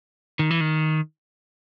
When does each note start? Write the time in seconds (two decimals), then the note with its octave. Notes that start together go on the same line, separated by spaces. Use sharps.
0.39 D#3
0.51 E3
0.61 D#3